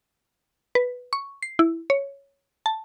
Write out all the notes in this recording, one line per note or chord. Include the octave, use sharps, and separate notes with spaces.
B4
C#6
C7
E4
C#5
A5